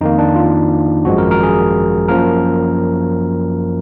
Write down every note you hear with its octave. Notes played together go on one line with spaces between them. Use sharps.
F2 D#3 A#3 D#4
D4
F4
G#1 F#2 F3 G#3 F#4
A#4
A#4
G#4
F#2 F3 A#3 A#4